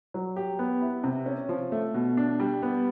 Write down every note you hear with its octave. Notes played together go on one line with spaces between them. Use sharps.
F#3
G4
B3
E4
C3
C#4
F3
A3
B2
D4
G3
B3